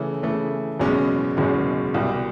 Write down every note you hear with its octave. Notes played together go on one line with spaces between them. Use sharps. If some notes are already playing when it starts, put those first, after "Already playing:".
Already playing: C#3 E3 A3
C#3 E3 A3
F#1 E2 B2 G#3 C#4
F#1 E2 B2 G#3 C#4
C2 B2 G3